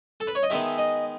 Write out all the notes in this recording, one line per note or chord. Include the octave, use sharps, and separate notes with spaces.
A4
B4
C#5
D#5
D#3 G#3 B3 D#4 E5
D#5